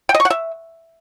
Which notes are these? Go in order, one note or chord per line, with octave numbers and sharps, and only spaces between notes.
G5
D#5
C#6
F#5
E5